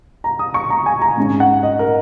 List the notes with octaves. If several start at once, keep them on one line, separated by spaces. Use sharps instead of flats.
A#5
D#6
C#6
A#5
G#5
A#5
G#2 G#3 C#4
F#5
D#5
A#4